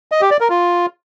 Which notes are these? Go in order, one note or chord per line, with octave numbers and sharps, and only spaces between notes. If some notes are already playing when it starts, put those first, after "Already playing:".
D#5
G4
D5
A#4
F4